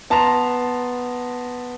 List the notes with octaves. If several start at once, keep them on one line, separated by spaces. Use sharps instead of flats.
B3 A5 A#5 C6 F7